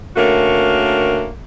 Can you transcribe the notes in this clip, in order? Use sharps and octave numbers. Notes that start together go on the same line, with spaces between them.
D3 A3 A#3 C#4 F#4 A#4